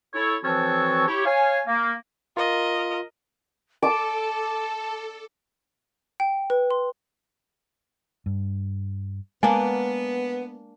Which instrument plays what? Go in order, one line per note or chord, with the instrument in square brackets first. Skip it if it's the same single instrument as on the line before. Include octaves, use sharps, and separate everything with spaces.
[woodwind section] E4 A4 C#5
E3 F3 C4 F#4 A4 C#5
E4 G4 C#5
C#5 F5 G#5
A#3
[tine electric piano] F4 [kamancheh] A#4 D#5
[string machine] A4 [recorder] A5 [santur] D6
[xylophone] G5
B4
C6
[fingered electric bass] G2
[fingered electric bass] G#3 [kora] A#3 D4 [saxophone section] B3 [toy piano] G#5